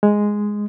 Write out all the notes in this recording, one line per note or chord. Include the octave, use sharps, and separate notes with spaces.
G#3